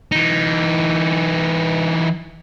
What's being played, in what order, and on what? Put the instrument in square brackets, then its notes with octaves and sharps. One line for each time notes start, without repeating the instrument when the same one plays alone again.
[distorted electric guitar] E3 D#4